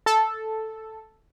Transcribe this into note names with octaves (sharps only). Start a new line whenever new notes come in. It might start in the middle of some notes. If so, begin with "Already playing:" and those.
A4